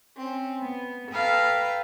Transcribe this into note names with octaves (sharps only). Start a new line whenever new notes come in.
C4 C#4
B3
A4 B4 F5 G5 A#5